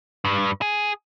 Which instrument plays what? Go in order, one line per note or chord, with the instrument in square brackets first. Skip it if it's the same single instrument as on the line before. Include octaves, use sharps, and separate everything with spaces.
[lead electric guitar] G2
G#4